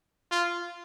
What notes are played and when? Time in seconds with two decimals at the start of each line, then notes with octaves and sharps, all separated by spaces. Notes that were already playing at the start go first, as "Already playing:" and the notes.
0.31 F4